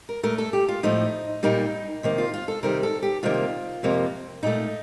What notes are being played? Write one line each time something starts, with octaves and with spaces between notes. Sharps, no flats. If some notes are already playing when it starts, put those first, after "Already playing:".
A#4
A#2 A3 A#4
A4
G4
F4
A2 F3 A3 D#4
A#2 G3 A#3 D#4
C3 D#3 A#3
F4
F4
A4
C3 D#3 G3 A#4
A4
G4
C3 D#3 G3 A#3 F4
F2 C3 F3 A#3
A#2 A3 D#4